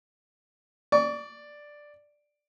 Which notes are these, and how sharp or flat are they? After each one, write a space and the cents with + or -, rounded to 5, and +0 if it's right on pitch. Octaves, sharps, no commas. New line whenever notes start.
D5 +5 C#6 +40